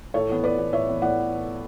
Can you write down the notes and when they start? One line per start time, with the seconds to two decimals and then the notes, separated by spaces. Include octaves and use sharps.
0.14 A2 A4 C#5
0.29 E3 B3
0.43 A2 B4 D5
0.58 E3 B3
0.72 A2 C#5 E5
0.87 E3 B3
1.02 A2 D5 F#5